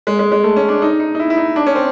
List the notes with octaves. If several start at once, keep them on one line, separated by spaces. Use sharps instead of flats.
G#3
G#3
G#3
A3
C#4
D4
D#4
D#4
D#4
E4
E4
D#4
D4
C#4
C4